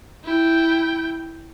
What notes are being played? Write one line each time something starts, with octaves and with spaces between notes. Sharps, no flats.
E4 G5